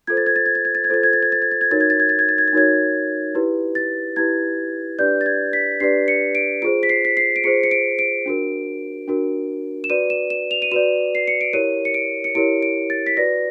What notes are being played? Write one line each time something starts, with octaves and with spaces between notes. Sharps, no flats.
F4 A4 C5 G#6
A6
G#6
A6
G#6
A6
G#6
A6
G#6
F4 A4 C5 A6
G#6
A6
G#6
A6
G#6
A6
G#6
D#4 F#4 A#4 C#5 A6
G#6
A6
G#6
A6
G#6
A6
G#6
A6
D#4 F#4 A#4 C#5 G#6
E4 G4 B4
A6
E4 G4 B4 G#6
D4 G4 B4 D5 G6
A6
G#6
B6
D4 G4 B4 D5 C7
C#7
D7
F4 G#4 C5 D7
B6
C7
B6
C7
D7
F4 G#4 C5 C#7
C#7
D7
D7
D4 F#4 A#4
D4 F#4 A#4
E7
F#4 B4 D5 D#7
E7
E7
F7
D#7
F#4 B4 D5 E7
C7
C#7
D7
E4 G4 A#4 C#5 D#7
C#7
D7
C#7
E4 G4 A#4 C#5 D7
D7
A6
B6
F#4 B4 D5 A#6